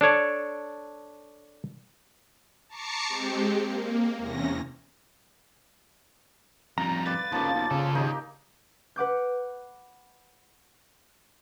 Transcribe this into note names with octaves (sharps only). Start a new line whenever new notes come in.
D4 A4 C#5 D5
A5 A#5 C#6 D6 C7 C#7
G#3 C4 G4
A#3
E2 C3 C#4 A#6
F2 G3 F5 A#5
B4 D5 A6
D#2 C#3 F3 A#3
B1
C#3 F4 A4
D#3 D#4 G4 G#4
B4 F#5 D6 G6